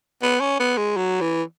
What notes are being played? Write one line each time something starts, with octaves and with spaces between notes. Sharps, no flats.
B3
C#4
B3
G#3
F#3
E3